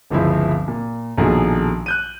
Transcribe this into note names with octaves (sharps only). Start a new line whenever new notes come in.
G1 C#2 F3 C4 E4 G#4
A#2
A#1 B2 D#3 F3 G#4 A4
F#6 G6 D#7